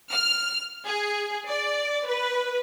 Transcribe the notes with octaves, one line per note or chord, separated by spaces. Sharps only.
F6
G#4
D5
B4